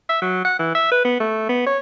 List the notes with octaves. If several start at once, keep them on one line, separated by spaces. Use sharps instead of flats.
E5
F#3
F#5
E3
E5
B4
B3
A3
B3
C#5